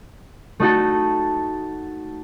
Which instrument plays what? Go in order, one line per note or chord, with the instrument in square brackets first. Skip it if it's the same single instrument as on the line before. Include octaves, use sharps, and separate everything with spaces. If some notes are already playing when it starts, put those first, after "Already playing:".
[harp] A3 D#4 F#4 A4